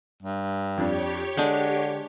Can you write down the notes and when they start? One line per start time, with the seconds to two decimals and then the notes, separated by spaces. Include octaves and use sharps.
0.22 G2
0.78 F2 D4 G4 C#5
1.37 D3 G#3 D4 G6